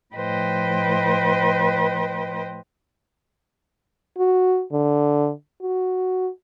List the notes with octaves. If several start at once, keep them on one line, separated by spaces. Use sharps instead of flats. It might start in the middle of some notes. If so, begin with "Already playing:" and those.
A2 F3 B4 C5 D#5 G5
F#4
D3
F#4